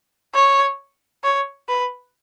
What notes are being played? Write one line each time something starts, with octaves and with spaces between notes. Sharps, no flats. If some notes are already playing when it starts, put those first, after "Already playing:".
C#5
C#5
B4